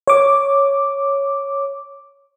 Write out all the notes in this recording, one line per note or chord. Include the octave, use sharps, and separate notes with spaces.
C#5 D6